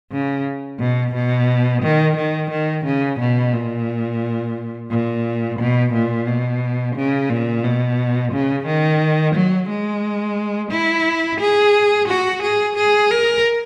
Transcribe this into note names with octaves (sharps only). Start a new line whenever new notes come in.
C#3
B2
B2
D#3
D#3
D#3
C#3
B2
A#2
A#2
B2
A#2
B2
C#3
A#2
B2
C#3
D#3
F#3
G#3
E4
G#4
F#4
G#4
G#4
A#4